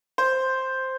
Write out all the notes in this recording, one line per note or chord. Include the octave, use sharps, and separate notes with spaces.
C5